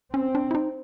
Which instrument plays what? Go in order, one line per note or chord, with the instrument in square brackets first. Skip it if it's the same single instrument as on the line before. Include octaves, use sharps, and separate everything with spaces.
[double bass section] C4 [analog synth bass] C#4
[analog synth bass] D4
E4
D#4